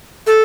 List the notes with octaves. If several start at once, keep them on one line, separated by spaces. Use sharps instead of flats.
A4